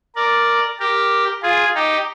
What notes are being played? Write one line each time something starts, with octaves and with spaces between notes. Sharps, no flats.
A#4 D5
G4 A#4
F4 G#4
D#4 G4